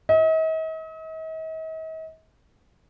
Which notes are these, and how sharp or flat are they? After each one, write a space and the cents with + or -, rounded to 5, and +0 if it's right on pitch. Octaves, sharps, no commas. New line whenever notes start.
D#5 +45